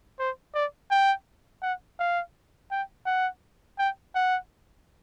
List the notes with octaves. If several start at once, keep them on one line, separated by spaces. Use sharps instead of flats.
C5
D5
G5
F#5
F5
G5
F#5
G5
F#5